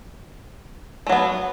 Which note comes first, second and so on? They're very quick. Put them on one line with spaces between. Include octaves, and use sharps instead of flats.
A3 F#3 B3